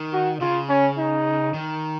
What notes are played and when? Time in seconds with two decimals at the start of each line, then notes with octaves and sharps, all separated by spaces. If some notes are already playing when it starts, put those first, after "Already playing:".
Already playing: D#3
0.13 F#4
0.41 C#3 F4
0.69 C#4
0.98 D#4
1.54 D#3